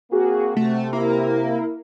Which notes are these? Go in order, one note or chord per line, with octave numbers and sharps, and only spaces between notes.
A#3 C4 F#4 G#4
C3 A3
A#3 E4 A#4